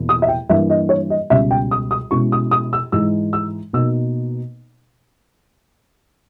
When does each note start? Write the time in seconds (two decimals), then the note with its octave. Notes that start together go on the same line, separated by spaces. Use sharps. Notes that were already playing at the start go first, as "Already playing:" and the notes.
Already playing: E2 B2 A#3 E4
0.09 D#6
0.22 E5
0.28 G5
0.49 G2 E3 A#3 E5
0.70 D#5
0.89 C#5
1.10 D#5
1.30 C#2 B2 G3 C#4 E5
1.51 G5
1.71 D#6
1.91 D#6
2.11 B2 G#3 C#4 E4 C#6
2.32 D#6
2.51 D#6
2.73 E6
2.92 G#2 E3 G#3 D#4 E6
3.33 E6
3.73 B2 A#3 D#4 E6